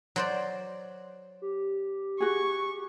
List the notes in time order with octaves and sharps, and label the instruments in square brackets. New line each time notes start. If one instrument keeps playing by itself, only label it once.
[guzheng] F#3 C5 D5
[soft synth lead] G4
[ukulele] F#4 G#4 [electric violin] C#6